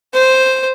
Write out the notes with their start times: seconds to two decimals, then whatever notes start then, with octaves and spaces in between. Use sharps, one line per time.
0.14 C5